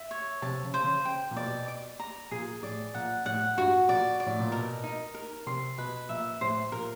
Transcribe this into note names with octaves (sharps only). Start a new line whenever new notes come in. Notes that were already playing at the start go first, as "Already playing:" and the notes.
Already playing: E5
C#5
C3 A5
C#3
C5
C#3
G5
A#2
B2 D5
D6
A#5
A#2 G#4
A2 D5
A#2 F#5
A2 F#5
G2 F#4
A#2 D5
D5
A2
A#2
B2 A#4
D#4
A#4
C3 C6
B2 B4
A#2 E5
A2 C5
A#2 A#4